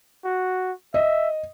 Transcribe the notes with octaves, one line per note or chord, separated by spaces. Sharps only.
F#4
D#5 E5